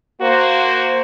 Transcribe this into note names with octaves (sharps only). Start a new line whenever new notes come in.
A#3 F#4 C5